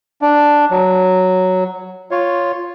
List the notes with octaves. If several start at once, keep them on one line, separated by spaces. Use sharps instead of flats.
D4
F#3
F4 C#5